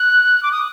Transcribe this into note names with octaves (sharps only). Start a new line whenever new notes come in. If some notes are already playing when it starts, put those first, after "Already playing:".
Already playing: F#6
D6
D#6